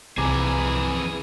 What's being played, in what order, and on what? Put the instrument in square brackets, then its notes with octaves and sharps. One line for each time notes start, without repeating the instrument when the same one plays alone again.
[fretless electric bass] C2 [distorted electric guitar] F2 E3 [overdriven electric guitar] G#4 [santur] G#5 A#5 D6